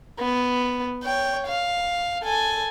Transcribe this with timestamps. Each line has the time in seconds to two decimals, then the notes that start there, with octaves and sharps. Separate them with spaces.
0.19 B3
1.04 C#5 G5
1.47 F5
2.23 A4 G#5